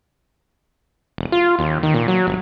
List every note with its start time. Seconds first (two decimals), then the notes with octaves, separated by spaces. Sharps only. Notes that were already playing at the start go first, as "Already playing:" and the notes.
1.18 E1
1.32 F4
1.59 D#2
1.83 D#3
1.94 A#2
2.08 F#3
2.27 G1